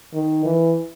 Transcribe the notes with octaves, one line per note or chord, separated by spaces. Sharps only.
D#3
E3